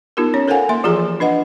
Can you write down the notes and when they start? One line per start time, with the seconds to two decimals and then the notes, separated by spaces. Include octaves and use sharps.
0.17 B3 D#4 F4 G4 A#4
0.34 C#4 C#5
0.48 A4 A#4 C5 F5 F#5 G#5
0.69 A#3 E5 C6
0.84 E3 F3 F4 G4 G#4 A#5
1.20 D4 B4 D#5 F#5